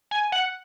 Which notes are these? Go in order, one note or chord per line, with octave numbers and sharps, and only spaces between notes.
G#5
F#5